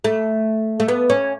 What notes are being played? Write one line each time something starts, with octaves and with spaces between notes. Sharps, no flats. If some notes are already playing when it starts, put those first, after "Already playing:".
A3
A3
B3
C#4